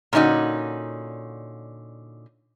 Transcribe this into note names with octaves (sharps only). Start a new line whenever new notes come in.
A#2 D3 C#4 D#4 F#4